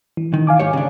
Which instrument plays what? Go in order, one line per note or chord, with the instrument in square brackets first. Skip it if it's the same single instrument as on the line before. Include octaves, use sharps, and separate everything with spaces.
[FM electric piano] E3
[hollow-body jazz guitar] D#3
[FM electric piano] F5 G#5 D6
[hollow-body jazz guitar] G#2 G4 C#5
C#3 D4